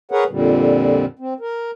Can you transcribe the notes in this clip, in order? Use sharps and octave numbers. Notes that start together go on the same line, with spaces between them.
G#4 A#4 B4 C#5 F#5
F2 A#2 D3 G3
C4
A#4